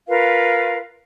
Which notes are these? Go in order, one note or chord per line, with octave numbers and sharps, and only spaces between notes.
F4 A#4 B4 F5